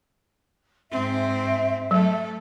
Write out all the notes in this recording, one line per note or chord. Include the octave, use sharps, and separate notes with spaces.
G#2 C4 E5
F#3 A3 A4